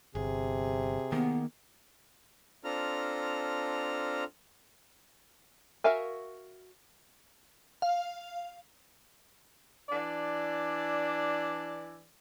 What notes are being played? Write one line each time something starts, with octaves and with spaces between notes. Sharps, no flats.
G1 C3 G#4
D#3 A#3 B3
C4 D4 F4 A4 A#5 F6
F#4 A#4 E5 F5 G#5
F5
E3 D4 D5